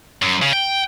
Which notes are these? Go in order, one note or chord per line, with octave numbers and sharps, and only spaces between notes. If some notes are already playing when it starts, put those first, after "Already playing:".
F#2
C#3
G5